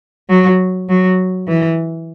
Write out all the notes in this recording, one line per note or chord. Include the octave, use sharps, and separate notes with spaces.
F#3
F#3
E3